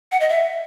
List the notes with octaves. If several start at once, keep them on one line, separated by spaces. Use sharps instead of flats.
F#5
D#5
E5